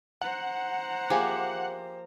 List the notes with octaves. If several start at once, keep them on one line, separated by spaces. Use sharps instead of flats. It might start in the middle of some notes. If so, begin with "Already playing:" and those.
C5 F#5 A#5
F3 A#3 G4 G#4 E5